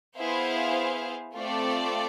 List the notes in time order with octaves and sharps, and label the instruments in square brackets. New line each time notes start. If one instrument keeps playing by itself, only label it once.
[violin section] B3 E4 G#4 C5 F5
A3 C4 F4 A4 D5